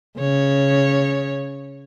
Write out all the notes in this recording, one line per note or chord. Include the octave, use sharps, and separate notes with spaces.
C#3 C#5